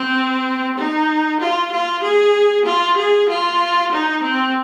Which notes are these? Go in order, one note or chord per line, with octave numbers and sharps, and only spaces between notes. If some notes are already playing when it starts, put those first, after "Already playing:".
Already playing: C4
D#4
F4
F4
G#4
F4
G#4
F4
D#4
C4